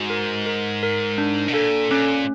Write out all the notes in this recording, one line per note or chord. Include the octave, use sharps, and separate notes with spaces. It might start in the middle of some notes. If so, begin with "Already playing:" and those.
Already playing: G#2 F#4
A#4
A#4
A#4
D4
B2
A#2 A4
A#2 C#4